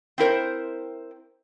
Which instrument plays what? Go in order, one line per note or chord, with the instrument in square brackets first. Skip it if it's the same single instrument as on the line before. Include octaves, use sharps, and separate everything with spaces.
[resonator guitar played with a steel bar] C4 E4 A#4 C5